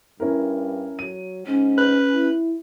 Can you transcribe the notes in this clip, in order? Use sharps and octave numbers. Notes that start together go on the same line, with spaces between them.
G2 C#4 E4 A#4
F#3 D#7
G#2 C#4
B4
E4